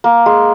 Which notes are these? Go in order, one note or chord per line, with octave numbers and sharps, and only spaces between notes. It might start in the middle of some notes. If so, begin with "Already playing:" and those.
A#3
G#3